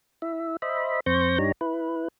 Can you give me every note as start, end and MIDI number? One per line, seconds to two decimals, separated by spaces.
0.22 0.57 64
0.22 0.57 76
0.62 1.00 72
0.62 1.00 75
0.62 1.00 76
0.62 1.00 83
1.06 1.38 41
1.06 1.38 60
1.06 1.38 72
1.06 1.38 85
1.06 1.38 91
1.06 1.38 94
1.38 1.52 43
1.38 1.52 62
1.38 1.52 63
1.38 1.52 67
1.38 1.52 73
1.38 1.52 82
1.61 2.08 64
1.61 2.08 71